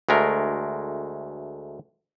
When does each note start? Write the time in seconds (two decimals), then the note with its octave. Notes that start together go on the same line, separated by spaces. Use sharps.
0.09 D2 G#3 A3 A#4